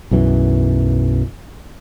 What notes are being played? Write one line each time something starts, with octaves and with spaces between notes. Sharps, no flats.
B1 F#2 E3